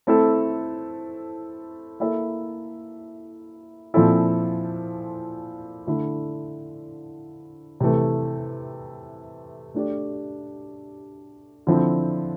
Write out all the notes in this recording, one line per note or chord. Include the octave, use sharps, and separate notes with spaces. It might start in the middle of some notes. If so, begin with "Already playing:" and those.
A3 C4 E4 A4
A#3 E4 A4 E5
A#2 F3 C4 E4 A4
D3 A3 E4
C3 E3 A3
A3 D4 G4 D5
D3 F3 C4 E4